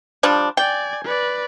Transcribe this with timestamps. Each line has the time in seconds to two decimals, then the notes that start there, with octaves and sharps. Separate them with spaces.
0.23 F3 G3 D4
0.57 D5 G5 G#5
1.05 B4 D5